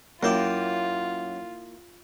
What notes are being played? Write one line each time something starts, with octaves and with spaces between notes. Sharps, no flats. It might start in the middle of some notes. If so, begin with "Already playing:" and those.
F#2 A#3 E4 F4 G5 D6